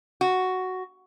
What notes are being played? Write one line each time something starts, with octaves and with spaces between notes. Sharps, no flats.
F#4